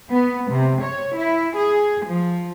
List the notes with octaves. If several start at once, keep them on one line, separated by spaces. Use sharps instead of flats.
B3
C3
C#5
E4
G#4
F3